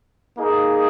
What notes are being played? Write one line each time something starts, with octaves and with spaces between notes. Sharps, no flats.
A#3 D#4 G#4 D#5